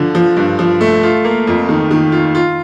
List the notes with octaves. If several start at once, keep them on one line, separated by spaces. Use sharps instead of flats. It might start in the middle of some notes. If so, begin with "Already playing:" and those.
Already playing: D3 F3
F3
G2
F3
A3
F4
A#3
F2
D#3
D#3
F4
F4